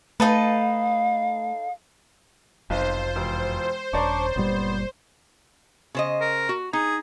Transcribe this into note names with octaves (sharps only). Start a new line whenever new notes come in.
A3 D#4 A4 B4 F5
F1 B1 F4 C5
E1
D#1 D4 C#5 D5 A#5 C#6 D6
F#1 A#2 G3 B3
C#3 C5 D#5
A#4
F#4
D#4 G#4